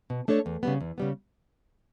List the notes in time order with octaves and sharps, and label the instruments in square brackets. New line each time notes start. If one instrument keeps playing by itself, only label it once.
[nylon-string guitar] B2
A3 D4 A4 C#5
E2
C#3 G3 B3
E2
C#3 G3 B3